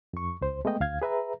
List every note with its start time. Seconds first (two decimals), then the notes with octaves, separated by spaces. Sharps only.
0.13 F2 C#6
0.41 C#2 C5
0.65 G#3 A3 B3 D#5 G5
0.80 D2 F5 G#6
1.02 G#4 B4 E5 A#5